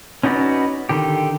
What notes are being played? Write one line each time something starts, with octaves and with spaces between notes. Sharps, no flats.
C#4 D#4 F#4 B4 D5
D3 D#3 G4